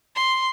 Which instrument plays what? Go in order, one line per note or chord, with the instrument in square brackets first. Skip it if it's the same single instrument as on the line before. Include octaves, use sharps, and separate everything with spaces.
[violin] C6